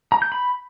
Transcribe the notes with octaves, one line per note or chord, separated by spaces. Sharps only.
A#5
G6
B5